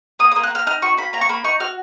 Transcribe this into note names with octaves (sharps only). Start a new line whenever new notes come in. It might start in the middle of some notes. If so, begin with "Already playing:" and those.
A#3 D#6
D#6
A#3
F#6
A#3 F6
D#4 F6
F#4 C#6
A#3 B5
A#3 A#5
C#6
A#3 B5
D#4 C#6
F#4 F6